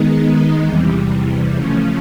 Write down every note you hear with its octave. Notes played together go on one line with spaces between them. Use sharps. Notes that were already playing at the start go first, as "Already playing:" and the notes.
Already playing: D#3 G#3 B3 D#4
E2 C3 E3 G3
C#3 F3 A3 C#4